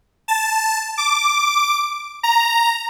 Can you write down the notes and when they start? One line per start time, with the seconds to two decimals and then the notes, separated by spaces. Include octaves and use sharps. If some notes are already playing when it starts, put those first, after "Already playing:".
0.28 A5
0.98 D6
2.23 A#5